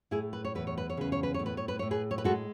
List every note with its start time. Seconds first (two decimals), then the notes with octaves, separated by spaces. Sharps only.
0.11 A2 E4 G#4
0.33 B4
0.45 C#5
0.55 E2 B4
0.67 C#5
0.78 B4
0.90 C#5
0.97 C#3 B4
1.12 C#5
1.23 B4
1.34 A2 C#5
1.46 B4
1.57 C#5
1.68 B4
1.79 A2 C#5
1.91 G#4 B4
2.11 C#5
2.18 B4
2.24 G#3 F#4 A4